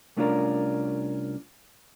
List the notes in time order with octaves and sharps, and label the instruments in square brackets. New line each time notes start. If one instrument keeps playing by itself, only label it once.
[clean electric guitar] C2 A3 C#4 D4 F4 A#4